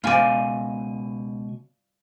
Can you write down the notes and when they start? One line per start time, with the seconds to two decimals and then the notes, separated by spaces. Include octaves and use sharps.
0.04 C#2 B2 F4 D5 G#5